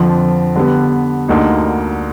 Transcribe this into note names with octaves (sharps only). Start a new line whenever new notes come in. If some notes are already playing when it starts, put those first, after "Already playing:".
Already playing: F2 D3 F3
D3 G3 B3
D2 D3 G3 A#3 D#4